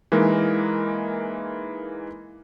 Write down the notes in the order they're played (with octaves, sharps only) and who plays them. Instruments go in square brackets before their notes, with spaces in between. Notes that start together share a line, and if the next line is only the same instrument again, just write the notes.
[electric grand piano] E3 G#3 A#3 D#4 A#4